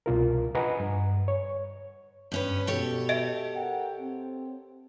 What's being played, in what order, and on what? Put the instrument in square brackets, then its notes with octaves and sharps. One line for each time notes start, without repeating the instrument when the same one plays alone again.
[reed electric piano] C2 B2 F4 A#4
B4 D#5 F#5 G#5 A#5
G2
C#5
[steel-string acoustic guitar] G2 C#4 B4
[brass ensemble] B2 [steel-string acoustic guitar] G4 A4 C#5
[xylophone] D#5 E5 D7
[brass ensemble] A#4 F#5 G5
C4